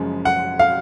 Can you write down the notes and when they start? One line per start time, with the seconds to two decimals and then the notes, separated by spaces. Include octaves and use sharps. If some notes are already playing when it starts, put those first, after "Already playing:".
Already playing: F#1 F#2 C#3 F3 G#3
0.25 F#5
0.59 F5